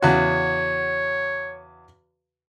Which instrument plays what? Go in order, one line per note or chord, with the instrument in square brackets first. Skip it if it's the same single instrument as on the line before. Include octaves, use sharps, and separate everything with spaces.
[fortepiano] E2 C#3 F#4 [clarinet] C#5